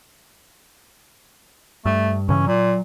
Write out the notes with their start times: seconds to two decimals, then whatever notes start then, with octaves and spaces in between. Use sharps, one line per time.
1.86 G2 A3
2.29 G2 C#3 E3 C#4
2.47 A#2 F#3